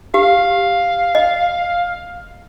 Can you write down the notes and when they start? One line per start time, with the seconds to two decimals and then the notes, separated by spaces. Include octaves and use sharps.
0.14 G4 F5
1.15 D#5